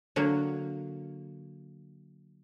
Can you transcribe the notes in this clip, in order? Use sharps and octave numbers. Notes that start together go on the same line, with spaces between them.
D3 F#3 A#3